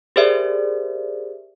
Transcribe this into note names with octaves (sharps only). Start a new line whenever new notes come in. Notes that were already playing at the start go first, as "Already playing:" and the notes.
G4 G#4 A#4 C5 D5 E5